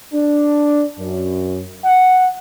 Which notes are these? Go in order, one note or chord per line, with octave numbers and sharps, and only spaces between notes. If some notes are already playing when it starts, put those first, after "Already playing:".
D4
F#2
F#5